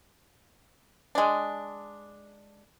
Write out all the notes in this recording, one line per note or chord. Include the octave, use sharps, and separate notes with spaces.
G#3 D4